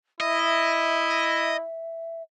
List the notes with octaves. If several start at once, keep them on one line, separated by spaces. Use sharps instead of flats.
E4 D#5 E5